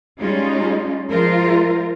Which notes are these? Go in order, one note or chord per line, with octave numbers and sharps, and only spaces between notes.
G3 G#3 C#4 D#4 F4
F3 G#3 F4 A#4 C5